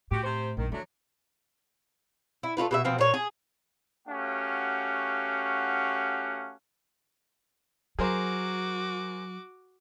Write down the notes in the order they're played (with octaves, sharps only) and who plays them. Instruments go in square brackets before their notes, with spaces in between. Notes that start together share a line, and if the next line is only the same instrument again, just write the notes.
[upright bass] A2 [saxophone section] F#4 G4
[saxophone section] C3 C5
[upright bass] A#1 F#2 [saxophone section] D#3
[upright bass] E3 [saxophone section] F#3 A3 D4
[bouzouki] E4
A3 E4 F4 B4
B2 A4 E5
B2 F3 C4
A#2 C#5
G#4
[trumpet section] A3 C#4 F#4 G4 F5 F#5
[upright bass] F#3 [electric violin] F#4 D6 [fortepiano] G#4 A#4 C5